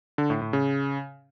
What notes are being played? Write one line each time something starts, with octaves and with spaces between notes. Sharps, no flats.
D3
A2
A2
C#3